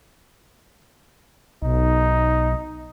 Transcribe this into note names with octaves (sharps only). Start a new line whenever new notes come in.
B1 D#4